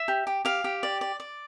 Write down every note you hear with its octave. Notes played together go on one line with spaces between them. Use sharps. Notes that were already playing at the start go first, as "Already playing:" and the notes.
Already playing: E5
G4
G4
G4 F5
G4
D5
D5
D5